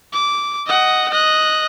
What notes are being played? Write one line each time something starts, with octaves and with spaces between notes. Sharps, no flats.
D6
D#5 F#5
D#5 F#6